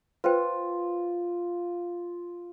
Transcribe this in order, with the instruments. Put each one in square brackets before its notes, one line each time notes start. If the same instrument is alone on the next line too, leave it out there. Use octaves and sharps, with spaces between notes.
[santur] F4 [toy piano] B4 C5 G5